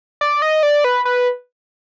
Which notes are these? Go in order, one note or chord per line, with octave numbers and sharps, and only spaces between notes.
D5
D#5
D5
B4
B4